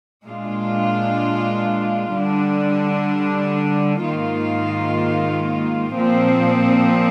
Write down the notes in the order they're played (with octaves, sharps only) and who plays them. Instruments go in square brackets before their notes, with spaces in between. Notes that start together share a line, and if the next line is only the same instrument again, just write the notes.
[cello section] A#2 G#3 D4 F4
D3 G3 D4
G#2 D#3 A#3 F4
A#2 F3 C4